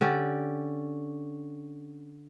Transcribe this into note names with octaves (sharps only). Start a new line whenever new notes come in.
D3 C#4 G4 D5